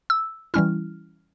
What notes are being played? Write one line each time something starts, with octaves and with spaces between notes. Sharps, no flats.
E6
E3 G3 C#4 E4 F6